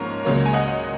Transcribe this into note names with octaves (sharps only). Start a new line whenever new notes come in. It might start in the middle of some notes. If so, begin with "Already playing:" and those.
Already playing: G#2 F3 A#3 C#4 A#4 C#5
C#2 C#3 F#3 A#3
G#5
D#5 F#5